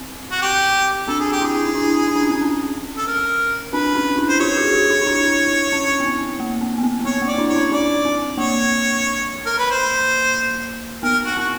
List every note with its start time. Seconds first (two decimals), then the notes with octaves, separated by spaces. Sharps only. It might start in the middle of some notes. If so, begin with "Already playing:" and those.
Already playing: C4
0.31 F#4
0.42 G4
1.08 C4 D4 A4
1.20 G#4
1.32 G4
1.41 D4 E4 G#4
1.66 D#4
1.75 D4 E4
2.08 D#4
2.16 D4
2.22 C#4
2.30 C4 D4
2.41 C#4
2.97 A4
3.07 A#4
3.73 C4 D4 B4
3.96 C#4 D#4
4.17 D4 E4
4.29 C5
4.39 F4 G4 C#5
4.57 F#4 G#4
4.73 F4 G4
4.90 D#4 F4
5.01 D#4
5.06 D4 E4
5.72 C#4
6.00 B3
6.06 C4
6.40 A#3
6.61 C4
6.78 B3
6.83 C4
7.01 C4
7.05 B3 C#5
7.22 A#3
7.28 D5
7.38 D4 E4
7.49 C#5
7.55 C#4 D#4
7.72 C4 D4 D5
8.05 C4
8.38 A#3 C#5
9.46 A#4
9.58 B4
9.71 C5
11.03 B3 A#4
11.25 F#4
11.37 C4 F#4